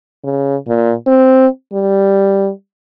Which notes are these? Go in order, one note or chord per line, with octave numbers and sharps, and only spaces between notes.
C#3
A#2
C4
G3